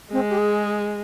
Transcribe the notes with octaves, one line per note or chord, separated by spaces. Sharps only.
G#3 C4
G4
G#4